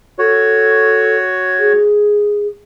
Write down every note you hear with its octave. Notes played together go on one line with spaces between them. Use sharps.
F#4 A4 C#5
G#4